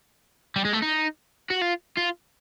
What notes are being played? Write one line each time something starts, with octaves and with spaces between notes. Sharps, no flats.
G3
G#3
A3
D#4
F#4
F4
F4